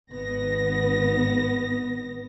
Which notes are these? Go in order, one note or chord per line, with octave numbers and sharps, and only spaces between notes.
G#1 B3 A#6